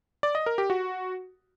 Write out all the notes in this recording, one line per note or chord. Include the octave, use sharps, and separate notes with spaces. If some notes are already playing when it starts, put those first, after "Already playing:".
D5
D#5
A#4
G4
F#4